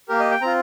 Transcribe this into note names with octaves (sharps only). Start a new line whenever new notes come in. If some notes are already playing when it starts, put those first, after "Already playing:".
A#3 G4 A#4
D#5
G5
C4 F4 A#5